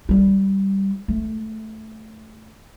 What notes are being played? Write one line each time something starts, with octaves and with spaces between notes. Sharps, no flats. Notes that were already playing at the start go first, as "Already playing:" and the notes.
G3 E4
A3